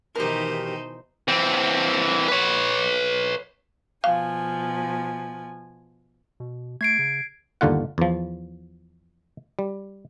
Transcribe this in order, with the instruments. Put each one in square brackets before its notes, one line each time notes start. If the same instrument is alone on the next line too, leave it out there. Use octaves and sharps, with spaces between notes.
[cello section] B2 D#3 E3 [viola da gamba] D#4 C5 [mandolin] G4 A#4
[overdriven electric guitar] E3 C4
B4 C#5
[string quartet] B2 F3 G#5 [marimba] F5
[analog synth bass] B2
[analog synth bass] A3 [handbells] G#6 C7 D7
[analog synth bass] C#3
[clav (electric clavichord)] G1 D#2 D3 F4 F#5
E2 F3
G3